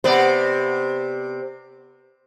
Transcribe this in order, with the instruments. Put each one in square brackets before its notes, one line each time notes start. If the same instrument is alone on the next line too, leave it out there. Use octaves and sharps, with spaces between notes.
[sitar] C3 B3 D5 [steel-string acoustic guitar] C5